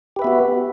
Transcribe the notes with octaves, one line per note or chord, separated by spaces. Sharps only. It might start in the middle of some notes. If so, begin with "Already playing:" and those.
B3 F#4 G4 B4 E5